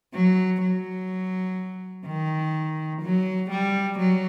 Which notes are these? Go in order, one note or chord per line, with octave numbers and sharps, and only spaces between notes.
F#3
F#3
D#3
F#3
G3
F#3